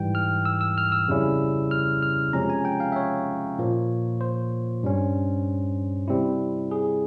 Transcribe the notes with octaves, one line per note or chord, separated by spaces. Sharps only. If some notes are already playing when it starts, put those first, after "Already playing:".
Already playing: G#2 E3 G3 G5
F6
E6
E6
F6
E6
F2 C#3 G3 C#4 E4
F6
F6
C3 F3 G#3 C#4 A#5
G#5
G5
F5
E5
C#5
A#2 F3 A#3
C5
G2 G3 C#4
C3 G3 C4 E4
G#4